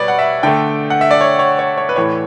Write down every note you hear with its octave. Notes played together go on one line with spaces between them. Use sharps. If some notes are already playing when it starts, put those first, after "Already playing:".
Already playing: B2 G3 B4 C#5 D5
F#5
E5
D3 A3 G5
F#5
E5
D5
C#5
C#5
C#5
C#5
B4
A2 E3 A3 C#5